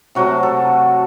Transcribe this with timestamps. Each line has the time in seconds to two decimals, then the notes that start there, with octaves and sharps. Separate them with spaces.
0.15 C3 F#3 A3 F#4
0.43 A4